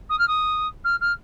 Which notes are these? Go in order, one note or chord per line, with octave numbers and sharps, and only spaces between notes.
D#6
F6
D#6
F6
F6